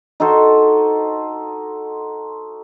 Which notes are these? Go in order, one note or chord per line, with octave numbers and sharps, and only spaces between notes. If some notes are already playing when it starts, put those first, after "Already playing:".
D#4 F#4 A4 C5